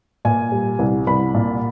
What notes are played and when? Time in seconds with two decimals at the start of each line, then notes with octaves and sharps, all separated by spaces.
0.25 A#2 G#5
0.52 G3
0.79 C2
1.07 C2 B5
1.34 A#2